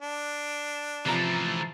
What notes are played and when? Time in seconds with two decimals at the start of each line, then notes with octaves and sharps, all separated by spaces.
0.01 D4
1.06 C3 E3 F3 A3 A#5 A6 C7